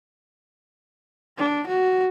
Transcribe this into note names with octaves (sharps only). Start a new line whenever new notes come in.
D4
F#4